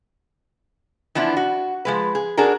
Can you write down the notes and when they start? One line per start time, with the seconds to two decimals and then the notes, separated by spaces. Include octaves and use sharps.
1.15 E3 F3 B3 D4 E4
1.37 F#4
1.85 F3 G#3 B4
2.15 G#4
2.37 D4 F#4 G#4 A#4